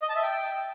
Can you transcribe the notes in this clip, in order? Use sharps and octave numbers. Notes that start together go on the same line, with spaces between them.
D#5
A5
E5
G5